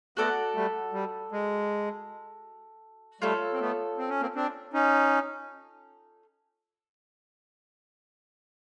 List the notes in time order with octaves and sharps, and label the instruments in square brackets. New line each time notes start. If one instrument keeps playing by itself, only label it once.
[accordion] A3 B3 [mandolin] F#4 A4 D5 F#5
[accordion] G3 A3
G3
G#3
[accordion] G3 A3 [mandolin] F4 A4 C#5
[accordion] C4
A3 B3
C4
C#4
A#3 C4
C4 D4
C#4 D#4